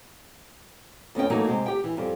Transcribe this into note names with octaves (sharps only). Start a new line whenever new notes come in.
F2 B3 C#4 G5
E3 F#3 A3 A#3 D#4 F#4
C3 G#3
G4 G5
E3
F2 G3